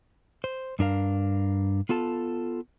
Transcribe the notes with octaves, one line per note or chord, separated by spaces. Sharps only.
C5
G2 D4 A#4 F5
B3 F4 A4 A5